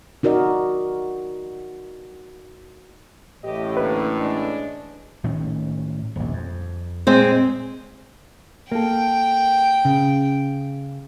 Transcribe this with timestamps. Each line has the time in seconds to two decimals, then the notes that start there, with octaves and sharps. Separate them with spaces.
0.23 D#4 F#4 A#4 D5 D#5
3.44 A1 A2 G4 D#5
3.77 D3 A#3 B4
4.16 G#3 D4
5.24 A2 D#3 C#4
6.16 D#1 A#1
6.33 F2
7.07 A#2 G#3 C4 C5
8.72 A#3 A4 G5
9.85 C#3